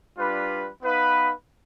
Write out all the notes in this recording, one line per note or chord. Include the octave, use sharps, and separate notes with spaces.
G3 D4 F4 B4
B3 D#4 B4 F5